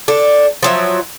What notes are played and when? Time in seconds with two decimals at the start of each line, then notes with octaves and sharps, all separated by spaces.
0.08 D4 A4
0.63 F3 F#3 E5